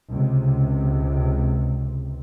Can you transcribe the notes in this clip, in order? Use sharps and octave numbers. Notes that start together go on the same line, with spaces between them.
C#2 C3